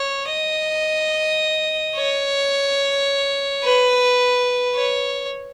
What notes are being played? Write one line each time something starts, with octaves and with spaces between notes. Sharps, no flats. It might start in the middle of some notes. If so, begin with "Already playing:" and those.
Already playing: C#5
D#5
C#5
B4
C#5